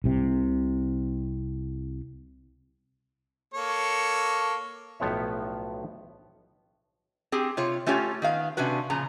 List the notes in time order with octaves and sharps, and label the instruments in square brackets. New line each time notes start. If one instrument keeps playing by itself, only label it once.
[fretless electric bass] C2 C3
[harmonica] A#3 A4 C#5
[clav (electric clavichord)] B1 A2 F3 B3 C#5 E5
[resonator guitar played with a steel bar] C4 G4 G#4
C3 F4 C#5
A3 C#4 F4 G4 C#5
D#3 B3 F5
C3 C#4 D4 F#4 B4
A#2 C#3 F3 A#5